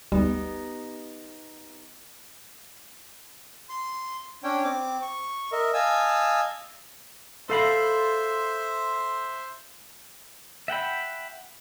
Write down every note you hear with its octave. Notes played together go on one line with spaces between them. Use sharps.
G1 D2 G3 B3 D#4 G4
C6
C#4 D4 C#5 G5
C4 D6
C#6
A#4 D#5 E5
D#5 F5 G#5 A5 E6
A4 C5 E5 F5 B5 C6
E5 F#5 G5 B5